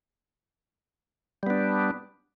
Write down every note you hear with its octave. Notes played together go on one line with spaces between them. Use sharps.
G3 B3 D4